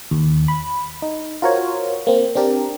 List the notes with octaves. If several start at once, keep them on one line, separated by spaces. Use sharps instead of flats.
D#2
B5
D#4
F4 F#4 A#4 C5 C#5
A#3 C4
C4 D4 G4 A#4 D5